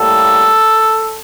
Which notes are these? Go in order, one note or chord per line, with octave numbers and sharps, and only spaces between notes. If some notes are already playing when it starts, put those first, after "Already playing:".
Already playing: A2 G3 A#3 A4